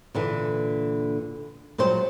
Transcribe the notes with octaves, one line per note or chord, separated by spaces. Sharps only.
A#2 D3 E3
A#2 F#3 G3 C5